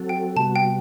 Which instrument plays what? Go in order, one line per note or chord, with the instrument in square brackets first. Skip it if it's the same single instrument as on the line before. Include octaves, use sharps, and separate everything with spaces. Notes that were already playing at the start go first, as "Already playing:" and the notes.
Already playing: [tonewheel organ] F#3 C4 F#4 A4
[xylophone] G5
[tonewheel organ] C3 G3 B3 F#4 [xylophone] A5
[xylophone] G5